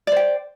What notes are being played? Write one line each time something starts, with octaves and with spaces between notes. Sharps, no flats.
C5 D5 G5